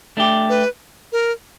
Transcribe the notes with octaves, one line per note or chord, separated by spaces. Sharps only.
A3 D4 G4
B4
A#4